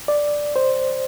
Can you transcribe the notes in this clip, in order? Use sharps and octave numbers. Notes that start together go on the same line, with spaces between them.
D5
C5